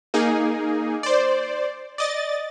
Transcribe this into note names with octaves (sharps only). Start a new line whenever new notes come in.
A#3 D#4 G#4
C5 D5
D5 D#5 A6